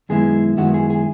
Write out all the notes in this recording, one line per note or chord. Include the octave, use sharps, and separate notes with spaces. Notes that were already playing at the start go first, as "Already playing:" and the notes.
F#2 D#3 G#3 B3 E4 G#4
F#2 D#3 G#3 B3 E4 F#4
G#4
G#4